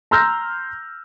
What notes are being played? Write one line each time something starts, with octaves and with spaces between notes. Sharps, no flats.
A#5 C6 E6 F6 G6 A#6